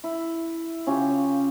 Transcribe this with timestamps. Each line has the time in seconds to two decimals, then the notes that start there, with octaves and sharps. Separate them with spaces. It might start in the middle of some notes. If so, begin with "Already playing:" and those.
0.04 E4
0.87 C#3 C#4 F4 G4